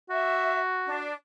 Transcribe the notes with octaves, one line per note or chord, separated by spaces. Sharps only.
F#4 E5
D4